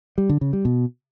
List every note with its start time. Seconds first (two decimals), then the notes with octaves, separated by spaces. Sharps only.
0.18 G3
0.29 D3
0.41 C#3
0.53 G3
0.65 B2